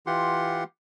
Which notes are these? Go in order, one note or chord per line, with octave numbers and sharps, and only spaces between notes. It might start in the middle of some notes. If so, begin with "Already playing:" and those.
E3 F4 G4 F#5 C6